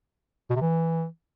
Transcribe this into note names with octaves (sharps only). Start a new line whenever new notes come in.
B2
C3
E3